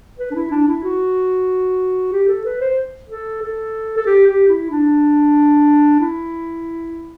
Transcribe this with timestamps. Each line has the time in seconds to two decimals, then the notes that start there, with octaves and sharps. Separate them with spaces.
0.18 B4
0.31 D4
0.35 E4
0.51 D4
0.68 E4
0.84 F#4
2.12 G4
2.28 A4
2.45 B4
2.61 C5
3.09 A4
3.42 A4
3.97 A4
4.06 G4
4.27 G4
4.49 E4
4.71 D4
6.00 E4